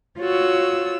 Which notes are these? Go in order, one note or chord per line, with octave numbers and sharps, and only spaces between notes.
F4 F#4 C#5 E6